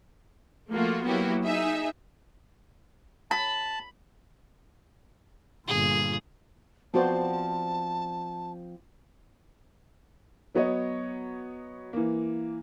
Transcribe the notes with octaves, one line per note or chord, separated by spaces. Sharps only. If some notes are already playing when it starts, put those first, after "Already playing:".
F3 A3 A#3 F4 F#4
F#3 A#3 B3 E4 F#4 G4
D#4 G#4 E5
A5 B5
G1 A#2 G#4
F3 B3 C4 F#4 C5 D5 A5
F#3 B3 C#5 D#5
E3 A#3